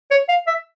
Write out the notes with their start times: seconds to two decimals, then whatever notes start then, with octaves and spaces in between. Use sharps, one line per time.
0.11 C#5
0.29 F5
0.47 E5